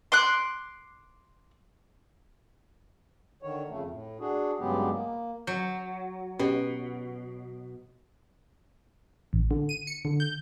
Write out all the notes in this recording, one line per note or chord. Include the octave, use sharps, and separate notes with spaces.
C6 D6 F#6
D3 D#3 C#5
F2 C#3 A3
A2
D4 F#4 G#4
G2 C#3 F#3 G#3 B3 G4
A#3
F#3 G6
B2 C#4 G4 B4
A1
D3
D#7
C#7
D3
G6